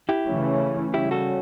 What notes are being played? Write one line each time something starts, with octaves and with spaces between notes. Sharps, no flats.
E4 G4
C#3 E3 A3 C#4
C#3 G3 C#4 E4 G4
F#4 A4